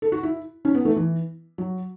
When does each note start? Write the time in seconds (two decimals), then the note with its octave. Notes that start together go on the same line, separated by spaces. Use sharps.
0.02 A4
0.12 F#4
0.23 E4
0.65 C#4
0.75 B3
0.85 A3
0.96 E3
1.58 F#3